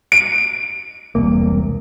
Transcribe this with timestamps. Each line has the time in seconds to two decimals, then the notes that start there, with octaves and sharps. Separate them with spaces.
0.12 D7
1.15 E1 C2 A#3